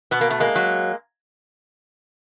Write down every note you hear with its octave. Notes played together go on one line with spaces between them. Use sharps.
B2 B3
A#3
A3
G#3 A#3
F#3